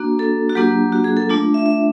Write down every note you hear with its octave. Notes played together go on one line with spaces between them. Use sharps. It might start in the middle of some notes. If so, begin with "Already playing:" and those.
Already playing: A#3 D4 F#4
A4
F#4
F#3 A#3 D4 F4 G4
F#4
G#4
A4
A3 D4 F4
E5
E5